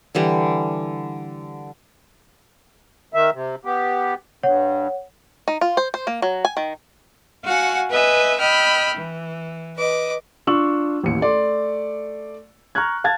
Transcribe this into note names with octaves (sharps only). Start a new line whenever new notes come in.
D3 E3 G3
D#3 E5
C3
B3 G4
G2 C#5 F#5
D#4
F4
C5
C5
A#3
F#3
G#5
D#3
F#4 F5 F#5 G#5
B4 D#5 E5 G#5
D#5 G5 B5 E6 F6
E3
B4 D#5 D6
D4 F4 C6 C#6 E6 F#7
A1 D#2 C#7
A3 D5 C6
A#5 C#6 F6 F#6 G#6
F5 A5 G#6 A6